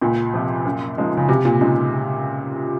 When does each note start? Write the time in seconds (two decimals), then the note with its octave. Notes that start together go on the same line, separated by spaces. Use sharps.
0.01 C#2 A#2
0.34 C3 F3
0.65 F#2
0.97 C#3 F3 G#3 D#4
1.17 C#3
1.29 C#2 C3
1.45 A#2
1.61 A#2 C#3 G#3 D#4